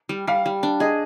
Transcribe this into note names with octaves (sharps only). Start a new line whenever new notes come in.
G3
G3 F5
G3
D4
G#4 D#5